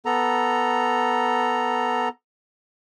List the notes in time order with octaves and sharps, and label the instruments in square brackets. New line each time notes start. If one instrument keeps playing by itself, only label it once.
[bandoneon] B3 A4 A#5